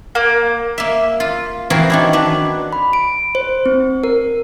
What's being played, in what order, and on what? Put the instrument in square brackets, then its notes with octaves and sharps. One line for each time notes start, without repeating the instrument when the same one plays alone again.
[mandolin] A#3
[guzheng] A#3 E5
F4
E3 F3 C4 F#4 G#4 A#4
D#3 D4 E4
D4 B4
[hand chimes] B5
D7
C5
C4
A#4